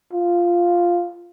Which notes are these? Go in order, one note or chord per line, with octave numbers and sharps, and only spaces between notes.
F4